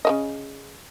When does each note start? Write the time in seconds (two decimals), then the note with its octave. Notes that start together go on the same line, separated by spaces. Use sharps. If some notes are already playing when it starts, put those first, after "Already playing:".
0.05 C#3 A#3 D#5